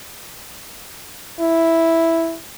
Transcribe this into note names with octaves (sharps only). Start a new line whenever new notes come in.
E4